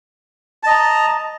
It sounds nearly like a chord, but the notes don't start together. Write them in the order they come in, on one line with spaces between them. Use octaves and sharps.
A5 D#5 A#5